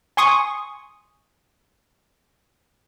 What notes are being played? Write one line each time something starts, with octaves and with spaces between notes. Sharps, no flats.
G#5 C6 C#6 D#6